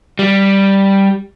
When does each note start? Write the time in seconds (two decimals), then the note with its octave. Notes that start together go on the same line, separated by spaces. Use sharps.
0.19 G3